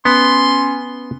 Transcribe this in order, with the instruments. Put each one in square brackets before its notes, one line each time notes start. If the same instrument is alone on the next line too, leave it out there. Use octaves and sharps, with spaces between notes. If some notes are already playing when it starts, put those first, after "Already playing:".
[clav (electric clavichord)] B3 [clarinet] C#4 [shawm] C6